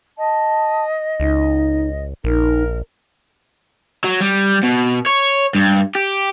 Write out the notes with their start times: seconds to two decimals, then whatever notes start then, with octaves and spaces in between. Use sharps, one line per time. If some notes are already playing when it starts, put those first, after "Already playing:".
0.18 D#5 A5
1.20 C#2 D#4
2.24 A#1 D#4 A#4
4.04 F#3
4.21 G3
4.63 B2
5.06 C#5
5.55 G2
5.95 G4